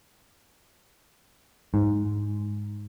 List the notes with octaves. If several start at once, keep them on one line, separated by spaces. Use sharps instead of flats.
G#2